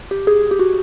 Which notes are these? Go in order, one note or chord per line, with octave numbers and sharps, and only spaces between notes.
G4
G#4
G4
F#4